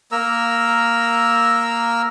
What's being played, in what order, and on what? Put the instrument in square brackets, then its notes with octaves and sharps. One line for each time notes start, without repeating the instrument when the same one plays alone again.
[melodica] A#3 A#4 A#5 E6